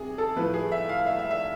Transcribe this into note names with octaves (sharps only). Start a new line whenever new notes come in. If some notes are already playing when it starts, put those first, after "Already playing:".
Already playing: C3 G#4
A4
A2 F3 A3 B4
G#4
E5
F5
E5
E5
E5